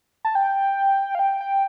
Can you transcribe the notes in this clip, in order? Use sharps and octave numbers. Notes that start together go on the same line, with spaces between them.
A5
G5
F5
G5
G5